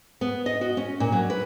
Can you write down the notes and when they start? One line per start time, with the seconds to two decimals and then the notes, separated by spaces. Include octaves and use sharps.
0.21 B3
0.46 D#5
0.61 F#4
0.77 C#4
1.00 A#2
1.12 F#3
1.30 B4